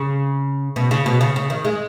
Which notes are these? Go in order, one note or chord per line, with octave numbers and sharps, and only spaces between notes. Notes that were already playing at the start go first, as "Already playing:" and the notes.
Already playing: C#3
B2
C#3
B2
C#3
C#3
D#3
G#3